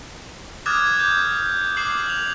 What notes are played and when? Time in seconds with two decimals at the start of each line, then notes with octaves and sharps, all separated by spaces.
0.66 D6 D#6 F6 F#6 G#6 A6
0.97 D6 G6
1.77 D6 F#6 C7 F#7
2.07 F7 F#7